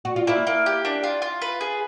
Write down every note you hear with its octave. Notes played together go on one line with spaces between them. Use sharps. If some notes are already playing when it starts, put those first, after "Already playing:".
F#4
F4
A#3 E4
A#3
G4
D4
F4
F4
B4
G#4